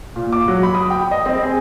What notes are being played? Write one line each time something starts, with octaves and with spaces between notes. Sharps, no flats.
A#2
D6
F#3
B5
D#6
G5
D#5
C4
G#4